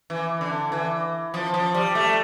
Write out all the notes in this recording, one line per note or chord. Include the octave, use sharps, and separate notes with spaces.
E3
D3
E3
F3
F3
G3
A3